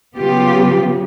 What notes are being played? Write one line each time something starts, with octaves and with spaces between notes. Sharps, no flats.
C#3 F#3 B3 F4 G4